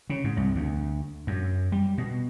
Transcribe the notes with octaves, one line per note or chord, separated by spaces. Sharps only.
C#3
G#2
C2
D2
F#2
G3
B2